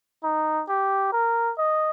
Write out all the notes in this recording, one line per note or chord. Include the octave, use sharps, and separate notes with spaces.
D#4
G4
A#4
D#5